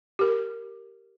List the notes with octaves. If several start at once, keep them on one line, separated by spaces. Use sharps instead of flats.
G4 A#4